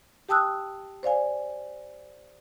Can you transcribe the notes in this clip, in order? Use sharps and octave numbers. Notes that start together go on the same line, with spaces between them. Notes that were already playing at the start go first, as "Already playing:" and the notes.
G4 G5 A5 D#6 E6 F#6
C5 D5 F5 G#5